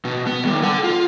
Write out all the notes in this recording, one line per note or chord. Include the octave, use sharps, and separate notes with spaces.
B2
B3
D#2 G3
A4 F#5
F4